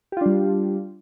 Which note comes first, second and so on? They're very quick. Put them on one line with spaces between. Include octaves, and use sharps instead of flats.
G4 F4 D4 G3